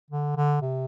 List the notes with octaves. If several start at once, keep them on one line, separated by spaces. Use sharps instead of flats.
D3
D3
C3